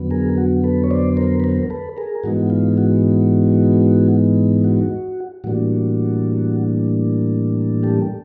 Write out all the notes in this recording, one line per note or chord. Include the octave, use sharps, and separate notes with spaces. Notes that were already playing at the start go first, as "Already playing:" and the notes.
Already playing: F2 D3 F#3 B3
G#4 A#4
F#4
A4 B4
C#5
C5 D5
A#4 C5
B4
A#4 C5
A4 B4
G#4 A#4
G#2 E3 G#3 B3 D#4 F#4
F4
F#4
F#4
A2 E3 G3 A#3 D4 F#4
G4 A4